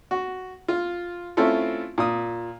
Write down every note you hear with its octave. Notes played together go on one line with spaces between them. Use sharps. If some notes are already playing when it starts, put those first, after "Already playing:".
F#4
F4
A3 C4 C#4 E4 F4 A4
A#2 D#6